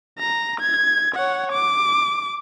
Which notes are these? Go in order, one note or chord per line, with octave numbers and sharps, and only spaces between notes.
A#5
G#6
C#5 F#5
D6